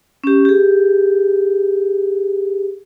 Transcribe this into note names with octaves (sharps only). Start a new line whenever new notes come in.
C#4 G4
G4 G#4